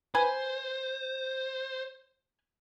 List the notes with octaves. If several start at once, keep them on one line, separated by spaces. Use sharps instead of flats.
B4 C5 G#5